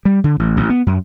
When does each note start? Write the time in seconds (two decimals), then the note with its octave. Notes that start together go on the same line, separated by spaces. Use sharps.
0.05 G3
0.24 D3
0.39 A1
0.57 A1
0.70 B3
0.87 F#2